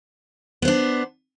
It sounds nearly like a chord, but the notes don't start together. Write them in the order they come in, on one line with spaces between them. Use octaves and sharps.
B3 C5 D4